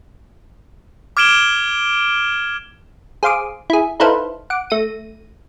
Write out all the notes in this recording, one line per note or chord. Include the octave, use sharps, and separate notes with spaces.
D6 F6 G#6 D7 E7 G7
G#4 C5 F5 C6 D6 D#6
E4 G#4
D#4 E4 A4 B4 C5 F5
F#5 D6
A3 A#6 D#7